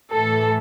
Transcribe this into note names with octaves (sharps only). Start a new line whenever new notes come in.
A2 E3 A4